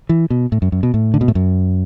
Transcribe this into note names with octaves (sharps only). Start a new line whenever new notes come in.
E3
B2
A2
F#2
F#2
B2
A2
D3
B2
A2
F#2